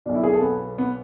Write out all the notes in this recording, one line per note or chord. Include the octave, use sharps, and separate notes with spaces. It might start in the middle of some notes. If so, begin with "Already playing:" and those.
B1 B2 D4
E4
G#4
A4
B3
B3